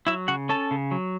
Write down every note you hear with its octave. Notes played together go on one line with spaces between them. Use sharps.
F#3 E4 E5
C#3 F#4 F#5
C#4 A4 A5
C#3
F#3